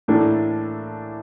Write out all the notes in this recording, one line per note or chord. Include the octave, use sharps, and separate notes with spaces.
A2 E3 A#3 D4 A4